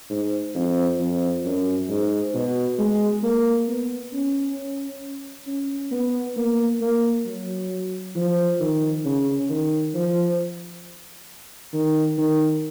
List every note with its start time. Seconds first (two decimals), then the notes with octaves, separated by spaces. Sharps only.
0.10 G#2
0.55 F2
1.00 F2
1.45 F#2
1.89 G#2
2.34 B2
2.79 G#3
3.23 A#3
3.68 B3
4.13 C#4
5.47 C#4
5.91 B3
6.37 A#3
6.81 A#3
7.26 F#3
8.16 F3
8.60 D#3
9.05 C#3
9.50 D#3
9.95 F3
11.73 D#3
12.18 D#3